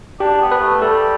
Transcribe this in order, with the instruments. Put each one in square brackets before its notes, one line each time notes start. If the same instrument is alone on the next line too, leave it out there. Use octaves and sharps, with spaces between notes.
[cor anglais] D4 [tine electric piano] G4
[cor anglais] B3
[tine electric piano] B4
[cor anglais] A3
[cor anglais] G3 [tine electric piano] A4